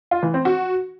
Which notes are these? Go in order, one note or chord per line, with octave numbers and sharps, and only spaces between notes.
F4
E3
C4
F#4